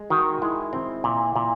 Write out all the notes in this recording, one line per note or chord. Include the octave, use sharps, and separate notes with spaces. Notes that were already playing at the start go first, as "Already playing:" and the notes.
Already playing: G#3
D#3 F#4
G#3 E4
C4
A#2
A#2